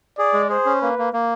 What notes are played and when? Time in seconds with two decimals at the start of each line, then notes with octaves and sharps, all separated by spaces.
0.18 G#4 D5
0.33 G#3
0.49 G#4 C5
0.66 C#4
0.81 A#3 B4
0.98 A#3
1.13 A#3